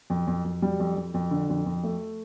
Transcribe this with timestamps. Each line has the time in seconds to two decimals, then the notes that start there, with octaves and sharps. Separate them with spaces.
0.10 F2
0.27 F2
0.45 F2
0.62 G3
0.80 F2
0.96 F2
1.14 F2
1.31 D3
1.50 F2
1.66 F2
1.83 A3